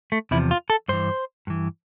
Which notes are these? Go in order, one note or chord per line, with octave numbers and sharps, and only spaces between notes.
A3
E2 C3 F3 E4
F4
A4
G2 E3 C5
G2 E3